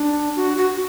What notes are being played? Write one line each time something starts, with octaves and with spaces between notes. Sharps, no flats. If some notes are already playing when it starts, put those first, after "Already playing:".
Already playing: D4
F#4
F#4